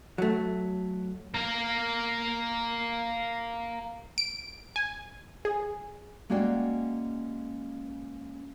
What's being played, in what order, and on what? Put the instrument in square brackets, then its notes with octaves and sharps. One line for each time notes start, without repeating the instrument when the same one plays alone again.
[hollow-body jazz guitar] F#3 A3
[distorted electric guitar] A#3 A#4
[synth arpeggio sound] D7
G#5
G#4
[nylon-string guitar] G#3 A#3 C#4 F#4 D5 G5